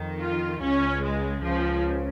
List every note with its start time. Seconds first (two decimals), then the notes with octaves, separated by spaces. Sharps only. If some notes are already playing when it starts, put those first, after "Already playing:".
Already playing: F2 D#3
0.20 F4
0.61 C#2 C#3 C#4
1.02 G#3
1.44 C#2 C#3 F3